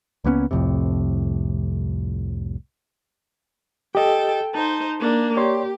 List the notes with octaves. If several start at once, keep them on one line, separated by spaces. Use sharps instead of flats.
C#2 A#3 B3 C#4
C2 F2 A2 C3
G4 A4 D#5 G5
D#4 C5 A5
A#3 D4
G4 C#5 D5 C6